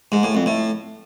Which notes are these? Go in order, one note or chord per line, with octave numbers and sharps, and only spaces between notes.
G#2
A2
F2
A2